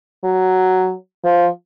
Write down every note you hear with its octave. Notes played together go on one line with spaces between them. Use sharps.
F#3
F3